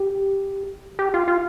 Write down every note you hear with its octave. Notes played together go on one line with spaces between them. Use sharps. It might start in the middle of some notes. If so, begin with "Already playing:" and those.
Already playing: G4
G4
F4
F4